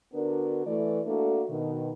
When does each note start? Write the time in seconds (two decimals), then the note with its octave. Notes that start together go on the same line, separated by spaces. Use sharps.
0.13 D3 B3 D4 F#4 A#4
0.66 E3 A3 D5
1.06 A3 A#3 D4 F#4 A4
1.49 B2 D#3